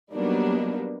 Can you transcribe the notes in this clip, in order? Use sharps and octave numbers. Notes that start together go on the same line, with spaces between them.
F#3 G3 A#3 B3 D4 D#4